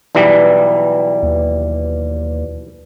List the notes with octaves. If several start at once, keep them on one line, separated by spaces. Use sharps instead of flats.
B1 E3 G3 B4 D5
D#2